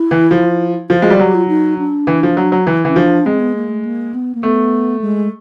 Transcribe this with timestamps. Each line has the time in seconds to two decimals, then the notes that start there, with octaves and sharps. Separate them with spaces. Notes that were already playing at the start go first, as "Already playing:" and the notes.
Already playing: E4
0.11 E3
0.31 F3
0.90 F3 F4
1.02 G#3 F#4
1.10 G3
1.20 F#3 G4
1.35 F4
1.48 D#4
1.78 D4
2.07 E3
2.23 F3
2.37 F#3
2.52 F#3
2.67 E3
2.85 E3 C#4
2.95 F3 D4
3.25 G#3 C4
3.40 B3
3.56 A#3
3.69 A3
3.85 A#3
4.14 B3
4.35 A#3
4.43 A3 B3
5.01 G#3